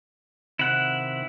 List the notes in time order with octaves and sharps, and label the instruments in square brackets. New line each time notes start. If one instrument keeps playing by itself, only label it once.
[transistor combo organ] C3 D#3 C4 [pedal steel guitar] E4 F#5